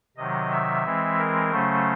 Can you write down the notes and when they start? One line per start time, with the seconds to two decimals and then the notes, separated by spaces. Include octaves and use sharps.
0.17 C3 D#3 F#3 D#5
0.51 E5
0.84 E3 G#3 C4
1.18 A#4
1.51 C#3 F#3 A3 C#4 C5